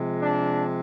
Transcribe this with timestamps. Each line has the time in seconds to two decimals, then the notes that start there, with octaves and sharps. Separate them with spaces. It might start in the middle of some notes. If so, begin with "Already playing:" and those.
Already playing: C3 F3 G#3
0.22 D4